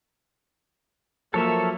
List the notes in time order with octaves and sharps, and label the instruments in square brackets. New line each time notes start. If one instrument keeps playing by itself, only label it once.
[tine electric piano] F3 F#3 [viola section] A#3 [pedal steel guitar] A4 C#5 E5